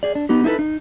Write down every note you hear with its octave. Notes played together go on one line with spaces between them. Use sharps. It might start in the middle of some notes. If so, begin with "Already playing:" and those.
G#4 D5
D4
B3 D#4 G4
D#4 E4 G#4 A4 B4
D#4